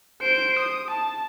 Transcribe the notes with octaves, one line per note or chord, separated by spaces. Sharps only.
C5 D7
D#6
A5